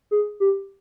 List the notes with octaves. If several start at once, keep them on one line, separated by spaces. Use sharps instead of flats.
G#4
G4